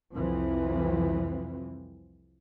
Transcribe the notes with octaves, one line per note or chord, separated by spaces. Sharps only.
C2 F2 E3 F3 C4